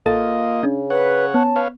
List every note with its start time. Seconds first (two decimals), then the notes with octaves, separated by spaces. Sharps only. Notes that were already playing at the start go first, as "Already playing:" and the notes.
0.06 A1 A#3 F4 A4 D#5 A6
0.63 C#3 C#4 D4
0.90 B4 C#5 F#5
1.34 B3 C#4 A5
1.56 B4 C#5 F5